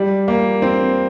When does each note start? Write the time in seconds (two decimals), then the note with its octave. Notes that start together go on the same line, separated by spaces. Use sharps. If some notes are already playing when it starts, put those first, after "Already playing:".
Already playing: G3
0.28 A#3
0.62 C4